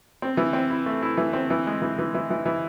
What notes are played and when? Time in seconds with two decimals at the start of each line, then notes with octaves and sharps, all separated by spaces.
0.22 C4
0.37 E3
0.53 C4
0.70 E4
0.86 A3
1.02 E4
1.17 E3
1.33 C4
1.50 E3
1.67 G#3
1.82 E3
1.99 E3
2.14 E3
2.30 E3
2.45 E3